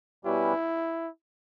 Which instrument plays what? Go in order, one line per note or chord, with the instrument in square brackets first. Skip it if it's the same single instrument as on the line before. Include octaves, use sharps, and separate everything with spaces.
[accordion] B2 G3 C#4 G4 B4 [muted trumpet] E4